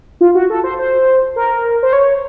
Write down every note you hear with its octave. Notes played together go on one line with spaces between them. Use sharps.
F4
F#4
A4
C5
C5
A#4
C5
C#5